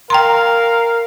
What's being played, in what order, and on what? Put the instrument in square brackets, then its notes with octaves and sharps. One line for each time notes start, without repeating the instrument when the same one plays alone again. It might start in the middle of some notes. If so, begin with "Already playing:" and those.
[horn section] A#4 F5 [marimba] G5 A#5 C6